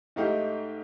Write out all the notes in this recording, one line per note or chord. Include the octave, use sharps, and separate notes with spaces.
G#2 A3 D#4 G4 F5